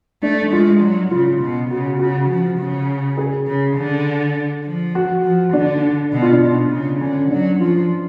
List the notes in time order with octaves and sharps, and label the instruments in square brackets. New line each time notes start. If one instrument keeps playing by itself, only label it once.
[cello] A3 [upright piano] D4
[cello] G#3 [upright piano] F4
[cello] F#3
[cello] C#3 [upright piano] F4
[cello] B2
[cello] C#3 [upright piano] F#4
[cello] C#3 [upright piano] F#4
[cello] F3
C#3
[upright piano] G#4
[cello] C#3
D3
F3
[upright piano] F#4
[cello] F3
[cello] D3 [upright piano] D4
[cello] B2
[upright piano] F4
D4
[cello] B2
C#3
[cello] D3 [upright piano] C#4
[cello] F#3 [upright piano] D4
[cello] F3 [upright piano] F4